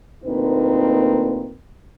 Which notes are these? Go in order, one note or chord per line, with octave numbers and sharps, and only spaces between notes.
D2 A#2 A#3 C4 D#4 B4